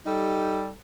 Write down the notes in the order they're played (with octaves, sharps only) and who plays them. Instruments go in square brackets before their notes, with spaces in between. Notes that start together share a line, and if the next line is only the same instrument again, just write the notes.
[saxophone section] G3 D#4 G4 A4